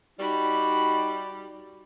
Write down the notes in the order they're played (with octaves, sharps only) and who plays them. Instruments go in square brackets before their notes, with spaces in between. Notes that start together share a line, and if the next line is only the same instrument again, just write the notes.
[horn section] G3 [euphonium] D#4 [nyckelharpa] F#4 B5